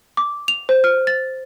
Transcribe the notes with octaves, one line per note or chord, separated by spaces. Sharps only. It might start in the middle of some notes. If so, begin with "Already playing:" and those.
D6
F7
C5
F6
A6